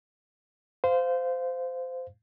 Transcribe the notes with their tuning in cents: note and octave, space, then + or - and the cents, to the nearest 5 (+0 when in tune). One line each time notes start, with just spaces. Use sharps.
C5 -20 F5 +0